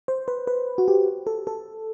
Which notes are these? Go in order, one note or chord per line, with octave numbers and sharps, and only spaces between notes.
C5
B4
B4
F#4
G4
A4
A4